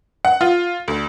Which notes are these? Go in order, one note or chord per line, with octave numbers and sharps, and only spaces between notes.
F#5
F4
D2